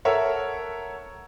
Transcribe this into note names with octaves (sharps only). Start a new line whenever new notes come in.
A4 A#4 C#5 E5 F#5